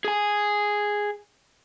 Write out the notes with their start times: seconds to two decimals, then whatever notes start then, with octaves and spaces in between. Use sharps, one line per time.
0.05 G#4 G#5